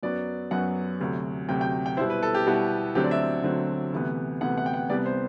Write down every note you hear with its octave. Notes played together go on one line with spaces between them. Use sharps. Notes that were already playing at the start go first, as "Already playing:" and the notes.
F#2 F#3 B3 D5
F#2 F#3 B3 F#5
D2 C3 F#3
D2 C3 F#3 G5
G5
G5
B2 G3 B3 E4 C5
B4
A4
G4
B2 G3 B3 E4 F#4
D2 D3 F#3 C4 G4
D5
E5
D2 D3 F#3 C4
D2 C3 E3 B3
D2 C3 E3 B3 F#5
F#5
G5
F#5
C2 C3 G3 B3 D5
C5